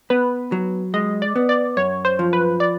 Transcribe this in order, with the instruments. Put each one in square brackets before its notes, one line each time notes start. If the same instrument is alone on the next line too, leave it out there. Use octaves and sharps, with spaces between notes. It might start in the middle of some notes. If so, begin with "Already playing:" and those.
[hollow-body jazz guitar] B3 [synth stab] B4
[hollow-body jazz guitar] F#3
[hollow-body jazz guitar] G#3 [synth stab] D#5
[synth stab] D5
[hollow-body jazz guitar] B3
[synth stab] D5
[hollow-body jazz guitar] F#2 [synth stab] C#5
[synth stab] C5
[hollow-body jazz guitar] F3
[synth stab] B4
D5